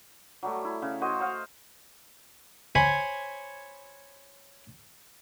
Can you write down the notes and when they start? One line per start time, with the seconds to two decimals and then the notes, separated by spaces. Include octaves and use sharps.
0.43 F#3 G3 A3
0.65 E4
0.82 C#3
1.01 F#4 C5 D#5
1.20 C5 D#5 F5 F#5
2.75 C5 C#5 G#5 B5 C#6